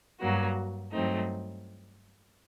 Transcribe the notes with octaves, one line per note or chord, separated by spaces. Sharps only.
G2 F#3 A#3 F#4
G2 F#3 A3 C4 D#4